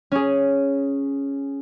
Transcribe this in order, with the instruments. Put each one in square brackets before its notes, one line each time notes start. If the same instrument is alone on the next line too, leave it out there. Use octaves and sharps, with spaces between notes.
[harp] C#4 G#4